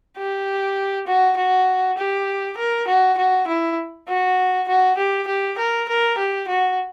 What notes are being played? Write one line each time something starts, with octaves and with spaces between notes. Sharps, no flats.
G4
F#4
F#4
G4
A#4
F#4
F#4
E4
F#4
F#4
G4
G4
A#4
A#4
G4
F#4